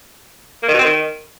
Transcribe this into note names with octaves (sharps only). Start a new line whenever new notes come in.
A#3
D#3
B2
C4
D#3